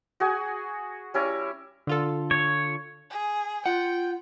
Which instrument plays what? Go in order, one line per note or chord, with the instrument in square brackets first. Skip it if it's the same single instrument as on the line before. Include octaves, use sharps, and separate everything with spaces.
[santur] F#4 G#4 F#5 G#5
G3 C#4 E4 A#5
[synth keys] D3 F4 A4
[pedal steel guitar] C#5
[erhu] G#4
[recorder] F4 [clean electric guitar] F#5 [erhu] G5